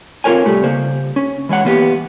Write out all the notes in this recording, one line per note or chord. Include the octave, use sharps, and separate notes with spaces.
C4 F4 G4 A#4 C#5 G#5
C2 A2 G3 A3
C#3 A#3 C5
C#4
E3 G#3 C#5 F#5
E3 A#3 B3 G4